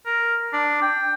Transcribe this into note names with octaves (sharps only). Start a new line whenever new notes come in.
A#4
D4
G5